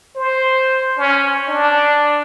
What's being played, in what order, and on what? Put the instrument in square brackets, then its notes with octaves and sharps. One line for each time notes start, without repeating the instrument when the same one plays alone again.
[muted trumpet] C5
C#4
D4